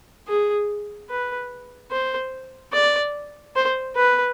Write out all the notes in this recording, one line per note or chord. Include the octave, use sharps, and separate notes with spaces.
G#4
B4
C5
D5
C5
B4